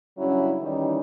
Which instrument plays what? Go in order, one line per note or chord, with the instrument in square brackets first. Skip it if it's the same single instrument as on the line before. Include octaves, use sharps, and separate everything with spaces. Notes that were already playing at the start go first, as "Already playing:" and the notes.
[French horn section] G2 C#3 F#3 C#4 E4
D#3 E3 G3 C#4 D#4